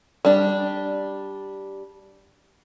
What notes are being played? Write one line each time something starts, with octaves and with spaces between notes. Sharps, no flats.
G3 D4